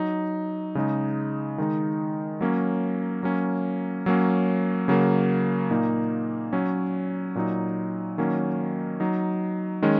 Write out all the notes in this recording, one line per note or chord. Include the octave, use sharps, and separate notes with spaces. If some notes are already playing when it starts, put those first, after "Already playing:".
Already playing: F#3 D#4
C#3 G#3 D#4
D#3 G#3 D#4
F#3 A#3 C#4
F#3 A#3 C#4
F#3 A#3 C#4
C#3 F#3 A#3
A#2 A#3 D#4
F#3 C#4
A#2 F#3 D#4
D#3 F#3 A#3 C#4
F#3 D#4
D#3 G#3 C#4